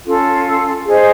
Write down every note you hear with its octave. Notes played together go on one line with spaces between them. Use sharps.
C#4 F4 A4
G#4 C5 D#5